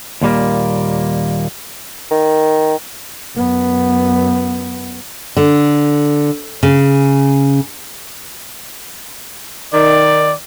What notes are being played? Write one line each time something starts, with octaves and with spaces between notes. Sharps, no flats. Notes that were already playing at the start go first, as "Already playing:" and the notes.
D#2 A#2 G3 A#3
D#3
F#2 B3
D3
C#3
D#3 D5